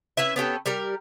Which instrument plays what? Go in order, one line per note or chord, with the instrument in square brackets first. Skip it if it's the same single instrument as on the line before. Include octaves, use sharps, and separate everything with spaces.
[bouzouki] C#4 E4 B4 E5
B3 C#4 G4 A4
G3 G4 A#4